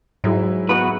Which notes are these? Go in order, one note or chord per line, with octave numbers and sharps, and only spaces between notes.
G#2 F#3 E4 G#4
B3 F#4 B4